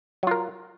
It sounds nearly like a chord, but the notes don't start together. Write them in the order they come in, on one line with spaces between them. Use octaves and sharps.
F#3 F4 A#4